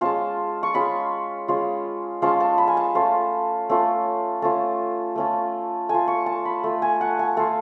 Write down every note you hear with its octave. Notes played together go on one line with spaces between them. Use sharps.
G#3 C#4 F4 A5
C#6
G#3 C#4 F4 B5
G#3 C#4 F4
G#3 C#4 F4 A5
A5
B5
G#5
A5
A3 C#4 F4
A3 C#4 F4
A3 C#4 F4 A5
A3 C#4 F4
A3 F4 G#5
C#6
A5
B5
A3 F4
G#5
F#5
G#5
A3 F4 A5